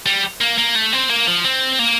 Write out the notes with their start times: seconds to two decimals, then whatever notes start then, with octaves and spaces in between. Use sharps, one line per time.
0.06 G3
0.41 A#3
0.58 A#3
0.75 A3
0.93 C4
1.09 A#3
1.27 F3
1.45 C4
1.79 A#3